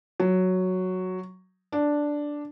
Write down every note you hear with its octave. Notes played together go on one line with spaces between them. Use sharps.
F#3
D4